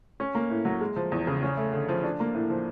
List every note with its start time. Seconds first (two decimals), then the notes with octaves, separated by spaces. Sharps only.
0.20 C#4
0.35 A#3
0.50 A2
0.65 F#3
0.81 G#3
0.96 F3
1.12 E2
1.27 C#3
1.43 C#4
1.57 A3
1.73 D3
1.89 F3
2.04 D4
2.20 A#3
2.34 A2
2.50 F3